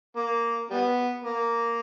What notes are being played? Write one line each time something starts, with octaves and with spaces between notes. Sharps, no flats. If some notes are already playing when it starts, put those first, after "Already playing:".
A#3
G3 B3
A#3